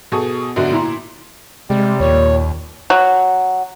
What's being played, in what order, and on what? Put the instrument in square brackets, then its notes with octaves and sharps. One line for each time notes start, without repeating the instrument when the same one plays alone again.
[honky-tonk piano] B2 G#4 A4 C#6 D#6
A#1 F#2 B2 D3
A#2 E4 A#5 C6
[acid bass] C3 [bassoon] G3 [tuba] G#3
[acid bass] D#2 [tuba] A#2 [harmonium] C#5
[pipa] F#3